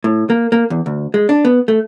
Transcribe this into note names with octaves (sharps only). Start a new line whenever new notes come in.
A2
A#3
A#3
E2
D2
G#3
D4
B3
A3